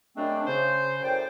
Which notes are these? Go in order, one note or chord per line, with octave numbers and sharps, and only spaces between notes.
F#2 G#3 A3 C4 D4
C#3 C5
F#2 A2 C5 D5 G5